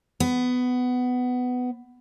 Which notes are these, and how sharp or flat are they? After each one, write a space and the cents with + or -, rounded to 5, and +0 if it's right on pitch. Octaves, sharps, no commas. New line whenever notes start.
B3 +15